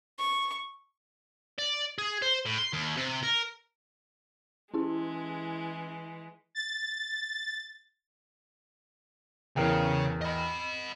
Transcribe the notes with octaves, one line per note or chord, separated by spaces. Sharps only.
C#6
D5
G#4
C5
A2
C6
D#2
C3
A#4
E3 G#3 C#4 E4 G#4
A6
E2 C#3 A#4 G5
D#5 B5